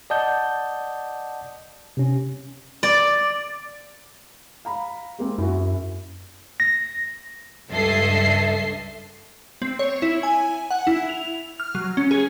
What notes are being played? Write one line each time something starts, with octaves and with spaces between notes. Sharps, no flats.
D5 D#5 F#5 A5 D#6 G6
C3 C#4
D5
F5 A#5 B5
G#3 A#3 C4
F#2 E4 F#4
A#6
C#2 G2 A4 D#5 E5 C7
C4
C#5
E4
G#5
F#5
E4
F7
F6
F#3
C#4
G#4